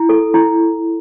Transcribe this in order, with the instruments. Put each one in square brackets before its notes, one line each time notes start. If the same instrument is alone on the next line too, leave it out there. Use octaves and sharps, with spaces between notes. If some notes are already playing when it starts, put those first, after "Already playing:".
Already playing: [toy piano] E4
A4
E4